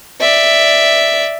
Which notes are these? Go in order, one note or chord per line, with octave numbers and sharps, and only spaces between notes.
D5 E5